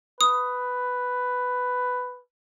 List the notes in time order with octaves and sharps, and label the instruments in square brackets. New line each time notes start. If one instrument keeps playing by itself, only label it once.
[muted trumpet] B4 [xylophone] D#6